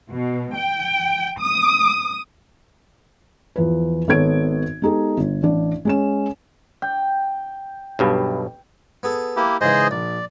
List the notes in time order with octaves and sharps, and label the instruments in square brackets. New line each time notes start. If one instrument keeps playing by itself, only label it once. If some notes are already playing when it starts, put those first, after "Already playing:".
[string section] B2
G5
D#6
[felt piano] E2 F3 B4
G#1 B3 A4 C#5 G#6 D7
G#3 B3 D#4 G4 A4
G1
A1 D4 D5
G#3 C#4 E7
[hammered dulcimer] G5
[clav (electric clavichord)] B1 G2 B2
[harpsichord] B3 G#4 A4
[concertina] A#3 E4 G4
[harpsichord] G#2 C#3 E3 [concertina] G#4 C5 D#5
[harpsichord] A#1 [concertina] D5